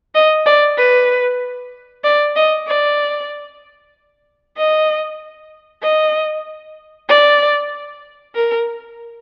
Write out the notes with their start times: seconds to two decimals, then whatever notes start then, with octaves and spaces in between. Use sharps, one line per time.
0.15 D#5
0.46 D5
0.77 B4
2.04 D5
2.36 D#5
2.67 D5
4.57 D#5
5.82 D#5
7.08 D5
8.35 A#4